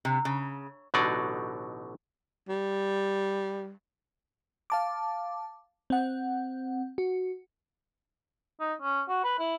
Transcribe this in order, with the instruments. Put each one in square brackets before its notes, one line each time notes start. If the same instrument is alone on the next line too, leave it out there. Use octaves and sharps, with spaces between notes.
[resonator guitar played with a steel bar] C3
C#3
[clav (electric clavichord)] A1 B2 D3 F#3 D#4 D5
[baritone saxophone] G3
[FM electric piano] F5 A5 D6
C4 F#5
F#4
[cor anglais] D#4
C#4
F#4
B4
E4